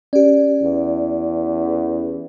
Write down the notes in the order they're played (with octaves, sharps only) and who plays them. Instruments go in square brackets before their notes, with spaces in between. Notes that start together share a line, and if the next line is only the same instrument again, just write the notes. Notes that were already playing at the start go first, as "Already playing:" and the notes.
[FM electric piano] C#4 G4 [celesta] D5
[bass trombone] E2